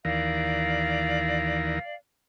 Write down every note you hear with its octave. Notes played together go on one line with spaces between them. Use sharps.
D#2 E3 A#4 D5 F5